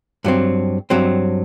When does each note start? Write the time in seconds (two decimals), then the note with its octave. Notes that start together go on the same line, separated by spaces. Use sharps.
0.24 G2 F#3 C4
0.90 G2 F#3 C4